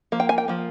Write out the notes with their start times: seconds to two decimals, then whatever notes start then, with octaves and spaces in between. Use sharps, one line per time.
0.12 F3 A#3
0.20 G5
0.29 G#5
0.38 G5
0.48 F3 A#3